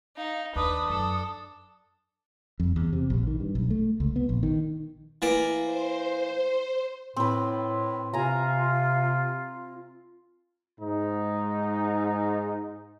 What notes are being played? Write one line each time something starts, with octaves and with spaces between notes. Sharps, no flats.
D#4 F5
D#2 D4 B4 D#6
F#2 A4
F2
E2
C3
A#1
D#3
G2
B1
A3
C#2
B3
A#1
D#3
E3 A#3 D5
C5
A2 C4 B4
C3 F4 G#5 A#5
G#2 D#4